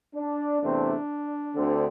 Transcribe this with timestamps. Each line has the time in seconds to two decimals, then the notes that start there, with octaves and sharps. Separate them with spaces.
0.15 D4
0.61 E2 C3 A3 C4 D4
1.55 D2 D3 C4